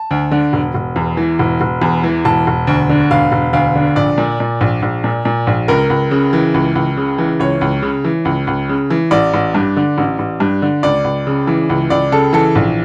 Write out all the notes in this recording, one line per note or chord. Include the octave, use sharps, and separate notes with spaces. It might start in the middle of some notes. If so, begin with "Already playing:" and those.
Already playing: A5
D2
D3
E1
E1
E2
E3
E1
E1
E2
E3
E1 A5
E1
D2
D3
E1 F5
E1
D2 F5
D3
A#1 D5
A#2
A#2
A#1
A#1
A#2
A#2
A#1
C#2 A#4
C#2
C#3
E3
C#2
C#2
C#3
E3
C#2 C#5
C#2
C#3
E3
C#2
C#2
C#3
E3
A1 D5
A1
G2
D3
A1
A1
G2
D3
C#2 D5
C#2
C#3
E3
C#2
C#2 D5
C#3 A4
E3 A4
A#1